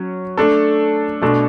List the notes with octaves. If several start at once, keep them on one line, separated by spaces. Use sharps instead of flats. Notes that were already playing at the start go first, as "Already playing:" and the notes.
Already playing: F#3 C#4
A3 D4 A4
B2 A3 D4 A4